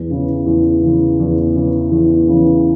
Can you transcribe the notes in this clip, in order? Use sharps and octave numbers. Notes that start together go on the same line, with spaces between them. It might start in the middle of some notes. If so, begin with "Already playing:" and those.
Already playing: E2
C#3 E3
E2
C#3 E3
E2
C#3 E3
E2
C#3 E3